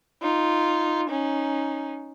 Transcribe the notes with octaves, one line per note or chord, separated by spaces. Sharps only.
D#4 F4
C#4 D#4